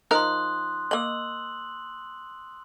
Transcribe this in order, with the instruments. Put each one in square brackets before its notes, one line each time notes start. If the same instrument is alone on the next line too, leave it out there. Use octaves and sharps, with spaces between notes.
[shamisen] F3 D#4 A#4 [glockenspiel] C6 D#6 F#6
[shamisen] A#3 D#5 [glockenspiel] E6 F#7